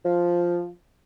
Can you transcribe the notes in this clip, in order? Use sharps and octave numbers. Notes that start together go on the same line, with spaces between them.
F3